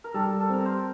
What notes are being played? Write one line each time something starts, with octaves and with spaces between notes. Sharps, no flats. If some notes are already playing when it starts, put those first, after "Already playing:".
A#4
G3 A4
A4
C4 A#4
C5